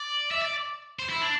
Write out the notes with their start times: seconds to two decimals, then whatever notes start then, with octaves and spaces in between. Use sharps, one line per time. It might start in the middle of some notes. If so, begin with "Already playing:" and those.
Already playing: D5
0.31 E5
0.42 D5
0.99 C5
1.09 E4
1.21 D4